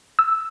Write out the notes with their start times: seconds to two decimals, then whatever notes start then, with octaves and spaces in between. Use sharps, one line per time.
0.19 E6